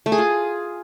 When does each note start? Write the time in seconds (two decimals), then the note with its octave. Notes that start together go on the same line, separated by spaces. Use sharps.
0.06 A3
0.12 G#4
0.18 F4